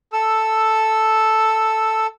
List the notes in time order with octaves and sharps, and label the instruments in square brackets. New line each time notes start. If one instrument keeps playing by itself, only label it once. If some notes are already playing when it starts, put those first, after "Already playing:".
[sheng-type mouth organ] A4 E6